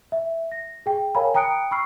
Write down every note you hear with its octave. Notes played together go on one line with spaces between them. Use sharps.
E5
A#6
G#4 G5
A#4 C#5 F5 G#5 A#5 B5
G5 A#5 D#6 F#6 C#7 D7
B5 C#6 E6 F6 C7